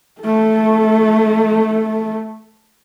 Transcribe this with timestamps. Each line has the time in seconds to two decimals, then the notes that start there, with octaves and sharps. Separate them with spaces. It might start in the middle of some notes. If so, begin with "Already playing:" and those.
0.22 A3 A4